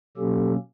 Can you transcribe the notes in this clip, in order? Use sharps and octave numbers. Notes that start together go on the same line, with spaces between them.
B2 F#3 A#3 C#4 G4 A4